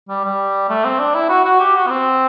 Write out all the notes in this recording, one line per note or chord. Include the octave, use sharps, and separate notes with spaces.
G3
G3
A3
C4
D4
E4
F#4
F#4
G4
F#4
B3
C4